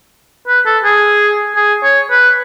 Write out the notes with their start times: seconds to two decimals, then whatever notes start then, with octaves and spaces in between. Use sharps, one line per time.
0.48 B4
0.66 A4
0.84 G#4
1.56 G#4
1.83 C#5
2.11 B4